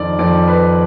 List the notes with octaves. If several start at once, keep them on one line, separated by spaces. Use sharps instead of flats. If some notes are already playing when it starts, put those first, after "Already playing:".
Already playing: F2 D#3 D5
F2 D#3 D5
B4